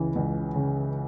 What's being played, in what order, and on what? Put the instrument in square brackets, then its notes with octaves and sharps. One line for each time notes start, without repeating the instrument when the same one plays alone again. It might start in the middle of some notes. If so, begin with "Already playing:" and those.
Already playing: [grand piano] C#2 C#3 E3
C#2
C#3